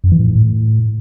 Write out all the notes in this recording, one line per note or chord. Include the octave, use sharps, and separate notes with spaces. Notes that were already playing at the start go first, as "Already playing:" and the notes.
F#2
E3
A2
G#2
A2